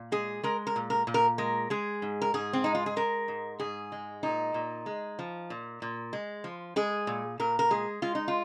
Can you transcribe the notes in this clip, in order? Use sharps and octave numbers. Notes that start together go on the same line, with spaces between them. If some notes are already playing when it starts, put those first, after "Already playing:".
Already playing: A#2
G#3 G#4
G#3 A#4
A#4
A#2
A#4
A#2
A#4
G#3 A#4
G#3 G#4
G#2
A#4
G#2 G#4
C4
G#3 D#4
F4
G#4
G#3 A#4
G#2
G#2 G#4
G#3
A#2 D#4
A#2
G#3
F3
A#2
A#2
G#3
F3
G#3 G#4
A#2
A#2 A#4
A#4
G#3 G#4
G#3 F4
D#4
F4